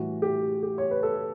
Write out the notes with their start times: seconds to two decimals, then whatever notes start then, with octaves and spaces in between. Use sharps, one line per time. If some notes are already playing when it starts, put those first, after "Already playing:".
Already playing: A2 E3 G3 F#4
0.22 G4
0.63 G4
0.78 C#5
0.91 B4
1.03 A4